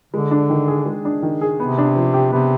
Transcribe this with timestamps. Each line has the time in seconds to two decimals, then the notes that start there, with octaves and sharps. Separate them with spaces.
0.14 D3 G#3
0.31 D4
0.50 D#3
0.68 G#4
0.86 G#3
1.05 D4
1.23 D#3
1.41 G#4
1.59 C3 B3
1.78 D4
1.96 F3
2.14 G4
2.32 C3 B3